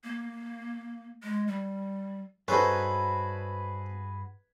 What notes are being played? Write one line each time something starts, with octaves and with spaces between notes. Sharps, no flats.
A#3
G#3
G3
G2 C#4 D#4 F#4 G#4 A4 B4 C5